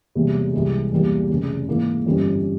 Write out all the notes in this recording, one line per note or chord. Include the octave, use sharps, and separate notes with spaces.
E1 E2 C3 G3 A#3
C2 C3 E3 G#3
E1 E2 E3 G3 A#3
F1 E2 C#3
G#2 E3 A#3 E4
G1 F2 E3 G3 C#4